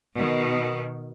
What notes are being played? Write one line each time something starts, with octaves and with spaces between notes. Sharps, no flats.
B2 D#3